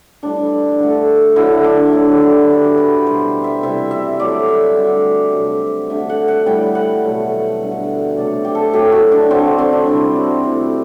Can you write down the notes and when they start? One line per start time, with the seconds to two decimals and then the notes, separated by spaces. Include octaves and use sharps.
0.22 A2 E3 G3 D4
0.79 D3 A3
1.36 D3 F#3 A3 E4
1.64 D4
1.93 A2 F#3 A3 D4
2.12 G4
2.30 G4
2.50 D3 A3 B4
2.78 B4
3.06 B2 G3 C5
3.44 E5
3.63 C3 E3 G3 E5
3.91 E5
4.19 A2 F#3 A3 D5
4.48 E5
4.76 D3 G3
5.33 C3 F#3 A3
5.90 D3 A3 E5
6.09 F#5
6.28 F#5
6.46 A2 G3 G5
6.75 F#5
7.04 B2 F#3 A3
7.61 D3 G3
8.17 C3 F#3 A3 D5
8.45 G4
8.55 A4
8.73 A2 F#3 A3 G4
8.92 F#4
9.12 D4
9.31 D3 F#3 A3 C4
9.58 C4
9.73 D4
9.87 C3 G3 E4
10.16 F#4
10.44 C3 E3 A3 E4